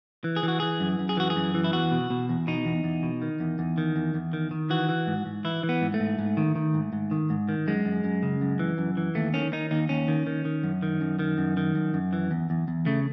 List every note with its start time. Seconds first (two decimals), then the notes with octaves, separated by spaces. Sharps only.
0.24 E3
0.36 G#4
0.43 E3 F#4
0.60 E3 G#4
0.80 F#2
0.99 F#2
1.09 G#4
1.17 E3 F#4
1.30 G#4
1.36 F#2
1.54 E3
1.64 E4
1.73 E2 F#4
1.92 B2
2.10 B2
2.29 E2
2.47 B2 D#4
2.65 E2
2.84 E2
3.03 B2
3.22 D#3
3.40 E2
3.59 E2
3.78 D#3
3.96 E2
4.14 E2
4.33 D#3
4.51 D#3
4.70 E3 F#4
4.89 E3
5.07 G#2
5.26 G#2
5.45 E3 E4
5.63 E3
5.69 B3
5.82 G#2
5.94 A3
6.00 G#2
6.19 G#2
6.37 D#3
6.56 D#3
6.74 G#2
6.93 G#2
7.11 D#3
7.30 G#2
7.49 D#3
7.67 F#2 G#3
7.85 F#2
8.04 F#2
8.23 C#3
8.41 F#2
8.59 E3
8.78 F#2
8.97 E3
9.15 D#2 A3
9.34 D#3 C#4
9.53 D#3 D#4
9.71 D#2 D#4
9.89 D#2 C#4
10.08 D#3
10.27 D#3
10.45 D#3
10.63 F#2
10.83 D#3
11.01 F#2
11.19 D#3
11.38 F#2
11.57 D#3
11.75 F#2
11.94 F#2
12.13 E3
12.31 E2
12.50 E2
12.68 E2
12.86 C#3 A3